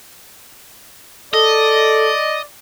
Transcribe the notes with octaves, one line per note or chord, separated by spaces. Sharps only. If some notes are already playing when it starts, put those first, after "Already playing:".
A4 D5 D#5